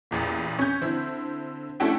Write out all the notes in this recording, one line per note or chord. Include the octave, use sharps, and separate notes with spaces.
A1 E2 A#2
C#4 G6
D3 C4 E4
A3 C#4 D4 E4 F#4 G5